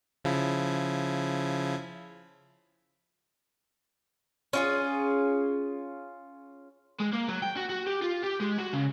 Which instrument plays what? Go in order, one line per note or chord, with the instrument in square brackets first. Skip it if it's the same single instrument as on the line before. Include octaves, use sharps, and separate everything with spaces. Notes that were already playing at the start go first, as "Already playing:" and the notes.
[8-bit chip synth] C#3 F3 E4
[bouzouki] C#4 F4 G#4
[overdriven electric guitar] G#3
A#3
F#3
G5
F#4
F#4
G4
F4
G4
G#3
F#4
C#3